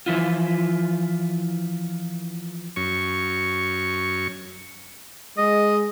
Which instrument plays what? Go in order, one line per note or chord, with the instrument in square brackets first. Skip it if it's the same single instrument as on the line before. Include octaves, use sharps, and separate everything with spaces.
[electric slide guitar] E3 F3 E4 F4
[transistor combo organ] F#2 C#6
[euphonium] G#3 [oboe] D#5